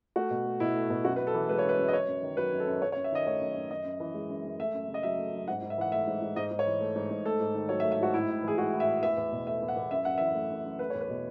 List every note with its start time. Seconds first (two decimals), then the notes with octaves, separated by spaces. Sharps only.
0.16 A3 F#4
0.30 B2
0.46 A3
0.60 B2 E4
0.76 A3
0.90 B2
1.05 F#2 F#4
1.16 F#2 B4
1.27 A4
1.34 E3
1.49 G#3 B4
1.59 C#5
1.64 F#2 B4
1.79 F#2
1.88 D#5
1.93 F#2 C#5
2.08 F#2
2.23 D#3
2.37 F#3 B4
2.53 F#2
2.60 A4
2.67 F#2
2.82 F#2 C#5
2.92 C#5
2.96 F#2
3.04 E5
3.12 D#3 D#5
3.26 A3 C#5
3.40 F#2
3.55 F#2
3.71 F#2 D#5
3.85 F#2
4.00 E3
4.15 G#3
4.30 F#2
4.45 F#2
4.59 A3 E5
4.74 F#2
4.88 C#3
4.94 D#5
5.03 F#3 E5
5.19 A3
5.33 F#2
5.48 G#2 F#5
5.62 G#2
5.70 E5
5.78 E3 F#5
5.92 A3 E5
6.07 G#2
6.22 G#2
6.36 G#2 D#5
6.51 G#2
6.59 C#5
6.67 E3
6.81 A3
6.95 G#2
7.10 G#2
7.25 A3 A4
7.40 G#2
7.55 D#3
7.69 F#3 C#5
7.80 E5
7.84 A3
7.92 E5
7.99 G#2 F#4
8.14 A2 E4
8.29 A2
8.43 E3 G#4
8.58 G#3 F#4
8.72 A2
8.80 E5
8.87 A2
9.03 E2 E5
9.17 E2
9.32 B2
9.47 A3 E5
9.62 E2
9.68 F#5
9.76 E2
9.91 F#2 E5
10.05 F#2 F#5
10.18 E3 E5
10.35 A3
10.50 F#2
10.65 F#2
10.79 A3 B4
10.90 E2 C#5
11.01 B4
11.09 B2